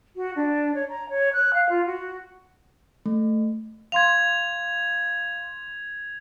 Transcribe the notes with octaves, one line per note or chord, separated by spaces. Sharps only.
F#4
D4
C#5
A#5
C#5
F#6
F5
F4
F#4
A3
F5 C6 G#6 F7